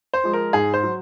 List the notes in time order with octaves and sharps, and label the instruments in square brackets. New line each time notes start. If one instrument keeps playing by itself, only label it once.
[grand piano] C5
F3 G#3
A#4
G#2 G#4
C5
F#3